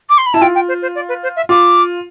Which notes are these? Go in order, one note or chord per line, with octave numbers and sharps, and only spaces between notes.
D6
C6
B5
E4 A5
F4 G5
G5
C5
C5
D5
B4
C5
E5
F4 D6